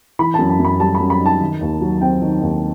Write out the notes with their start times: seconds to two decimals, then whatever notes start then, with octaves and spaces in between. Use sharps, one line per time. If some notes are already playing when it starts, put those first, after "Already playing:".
0.19 E3 B5
0.34 F#2 A5
0.49 A5
0.59 F#2
0.65 B5
0.80 G3 A5
0.95 B5
1.00 F#2
1.10 B5
1.20 D#4
1.26 A5
1.41 D#3
1.61 D#2
1.81 F#3
2.01 C4 G5
2.22 D#3
2.42 D#2